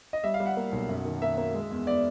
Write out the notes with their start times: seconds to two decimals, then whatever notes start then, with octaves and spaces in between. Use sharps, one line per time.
0.13 D#5
0.24 G3 E5
0.34 F5
0.40 G3
0.46 F#5
0.57 A#3
0.72 B1
0.89 F#2
1.05 D#3
1.22 A#3 E5
1.38 A#3
1.54 G#3
1.71 E2
1.87 B3 D5